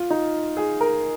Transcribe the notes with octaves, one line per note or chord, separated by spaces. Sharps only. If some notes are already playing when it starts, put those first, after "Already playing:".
Already playing: F4
D#4
G#4
A#4